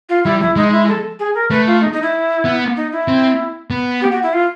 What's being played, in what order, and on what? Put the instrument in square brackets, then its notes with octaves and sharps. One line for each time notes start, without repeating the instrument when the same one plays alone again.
[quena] F4
[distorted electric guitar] G3 [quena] E4
[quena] E4
[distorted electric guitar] G#3 [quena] D#4
[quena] E4
A4
G#4
A#4
[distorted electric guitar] A3 [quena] B4
[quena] F4
D#4
D#4
E4
[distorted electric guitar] B3
[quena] D#4
E4
[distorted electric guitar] C4
B3
[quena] G4
F#4
E4
F4